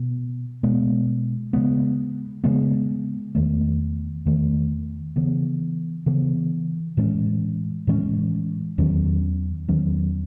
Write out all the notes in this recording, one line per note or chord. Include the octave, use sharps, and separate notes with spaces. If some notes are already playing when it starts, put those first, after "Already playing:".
Already playing: B2 B3
B2 G#3 B3
C#3 G#3 B3
C#3 G#3 B3
E2 D#3 A3
E2 D#3 A3
C#3 E3 B3
C#3 E3 B3
A2 E3 G#3 C#4
A2 E3 G#3 C#4
E2 D#3 F#3 C#4
E2 D#3 F#3 C#4